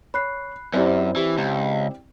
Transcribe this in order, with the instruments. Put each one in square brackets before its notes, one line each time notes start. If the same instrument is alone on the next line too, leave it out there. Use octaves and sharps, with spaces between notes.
[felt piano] C#5 [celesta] B5 F#6 C7
[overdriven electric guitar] F#2 [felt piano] C4 E4 D5 [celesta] G4 C5
[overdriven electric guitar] E3 [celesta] G4
[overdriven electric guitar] C#2